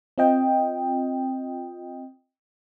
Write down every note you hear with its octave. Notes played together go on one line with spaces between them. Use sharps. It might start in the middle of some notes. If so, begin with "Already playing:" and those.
C4 F4 D#5 G5